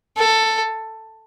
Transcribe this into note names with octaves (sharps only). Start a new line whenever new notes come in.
A4